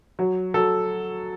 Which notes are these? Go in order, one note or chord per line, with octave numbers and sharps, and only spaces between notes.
F#3
F#3 A4